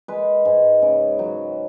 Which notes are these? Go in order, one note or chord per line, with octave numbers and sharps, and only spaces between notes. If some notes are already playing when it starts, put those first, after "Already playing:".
G#3 B4
G#2
C#3
F#3